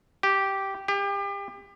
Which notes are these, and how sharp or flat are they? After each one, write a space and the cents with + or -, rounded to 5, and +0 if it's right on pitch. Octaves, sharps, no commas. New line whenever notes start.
G4 -10
G4 +30